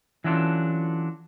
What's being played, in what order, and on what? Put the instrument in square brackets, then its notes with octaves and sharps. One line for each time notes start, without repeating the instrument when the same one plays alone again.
[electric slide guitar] E3 F#3 C#4 D4 F4 A4